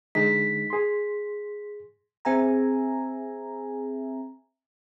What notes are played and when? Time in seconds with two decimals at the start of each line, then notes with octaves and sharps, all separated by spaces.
0.15 D3 G#3 D#4 B6
0.70 G#4 C6
2.25 C4 G#4 E5 G#5 A#5